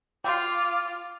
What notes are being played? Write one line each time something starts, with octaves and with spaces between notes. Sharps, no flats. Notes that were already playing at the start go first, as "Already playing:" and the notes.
F4 G5 C6 D6